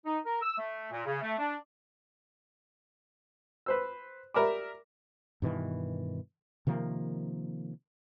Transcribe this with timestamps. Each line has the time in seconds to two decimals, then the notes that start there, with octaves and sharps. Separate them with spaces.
0.05 D#4
0.25 A#4
0.41 E6
0.57 A3
0.91 A#2
1.06 C#3
1.22 A3
1.38 D4
3.66 B4 C5 E6
4.34 G4 A#4 D5 E5 B5 D6
5.42 G2 B2 D#3 E3
6.67 C3 D#3 F3 A#3